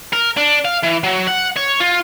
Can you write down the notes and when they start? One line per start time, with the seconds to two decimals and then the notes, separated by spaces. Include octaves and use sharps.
0.13 A#4
0.37 D4
0.65 F5
0.83 E3
1.04 F#3
1.27 F#5
1.56 C#5
1.80 F4